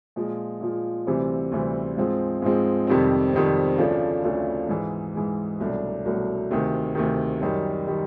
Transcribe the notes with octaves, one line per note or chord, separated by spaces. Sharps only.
A#2 F3 G#3
A#2 F3 G#3
D2 C3 E3 G3 C4
D2 C3 E3 G3 C4
G#2 F3 G#3 C4
G#2 F3 G#3 C4
F2 C3 D#3 G3 C4
F2 C3 D#3 G3 C4
D2 C#3 F3 A3 D4
D2 C#3 F3 A3 D4
G#2 E3 G#3
G#2 E3 G#3
C2 B2 F#3 A3 D4
C2 B2 F#3 A3 D4
D2 C3 D#3
D2 C3 D#3
F#2 D#3 G3
D#3 G3